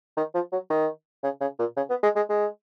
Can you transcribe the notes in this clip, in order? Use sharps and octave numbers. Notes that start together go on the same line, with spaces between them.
D#3
F3
F#3
D#3
C#3
C#3
A#2
C#3
B3
G#3
G#3
G#3